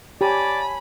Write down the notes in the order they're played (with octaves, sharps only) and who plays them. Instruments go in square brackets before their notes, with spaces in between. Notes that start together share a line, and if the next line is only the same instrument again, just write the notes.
[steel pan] G4 [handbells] C#5 G#5 A5 [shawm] D5 [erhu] B5